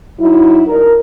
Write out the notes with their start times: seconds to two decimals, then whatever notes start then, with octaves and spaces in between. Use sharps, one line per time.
0.19 F#3 D#4 E4
0.67 D4 A#4